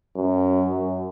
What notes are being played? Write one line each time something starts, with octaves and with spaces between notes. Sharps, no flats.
F#2
F#2